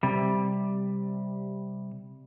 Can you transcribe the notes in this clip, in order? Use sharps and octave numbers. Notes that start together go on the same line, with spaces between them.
C3 G3